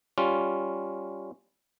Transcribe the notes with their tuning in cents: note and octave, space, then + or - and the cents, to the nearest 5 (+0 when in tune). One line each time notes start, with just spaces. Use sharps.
G3 +0 C#4 +0 F4 +0